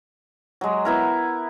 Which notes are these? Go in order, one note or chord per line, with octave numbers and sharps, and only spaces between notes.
F#3 G#3
B3 E4 A#4